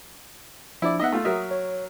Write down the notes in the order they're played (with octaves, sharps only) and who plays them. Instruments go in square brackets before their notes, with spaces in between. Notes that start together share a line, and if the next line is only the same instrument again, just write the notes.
[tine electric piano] F3 D4 [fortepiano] E4 D5
[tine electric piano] B3 D#4 [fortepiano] D#5 E5 F#5
[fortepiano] A3 F4
[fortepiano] F#3 A#4 E5 [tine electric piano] D#6
[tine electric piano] C#5